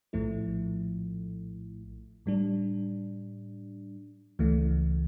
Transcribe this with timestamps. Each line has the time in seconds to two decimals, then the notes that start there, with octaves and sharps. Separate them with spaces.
0.13 A#1 A2 F3 A3 E4
2.26 A2 G3 D4
4.39 C#2 C#3 E3 A3